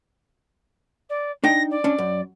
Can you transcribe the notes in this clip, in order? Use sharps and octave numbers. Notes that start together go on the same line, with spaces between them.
D5
D4 D#4 G5 A#6
D5
C#4 D4
F#2